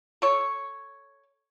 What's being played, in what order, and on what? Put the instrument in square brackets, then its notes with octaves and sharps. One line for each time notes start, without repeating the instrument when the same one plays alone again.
[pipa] A4 C#5